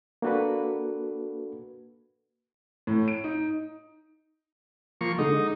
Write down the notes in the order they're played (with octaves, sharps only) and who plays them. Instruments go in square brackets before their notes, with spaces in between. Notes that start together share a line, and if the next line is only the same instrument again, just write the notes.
[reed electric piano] A#3 D4 F#4 A4 B4
[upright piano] A2
D7
D#4
[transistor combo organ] F3 A#3 C#6
[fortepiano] D3 G#3 [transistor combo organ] D#4